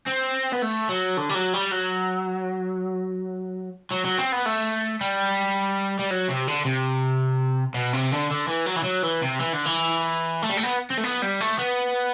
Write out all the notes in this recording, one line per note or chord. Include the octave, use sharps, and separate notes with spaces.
C4
B3
A3
F#3
D3
G3
F#3
G3
F#3
F#3
F#3
C4
B3
A3
G3
G3
F#3
C3
D3
C3
B2
C3
D3
D3
E3
F#3
E3
F#3
E3
C3
E3
D3
E3
A3
G3
A3
B3
C4
A3
B3
G3
A3
B3